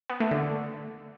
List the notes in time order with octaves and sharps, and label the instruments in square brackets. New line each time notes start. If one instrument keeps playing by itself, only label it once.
[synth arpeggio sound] B3
A3
D3